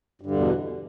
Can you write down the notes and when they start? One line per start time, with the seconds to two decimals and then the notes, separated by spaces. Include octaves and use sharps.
0.21 G2
0.26 D3
0.31 E2
0.35 B2
0.40 E3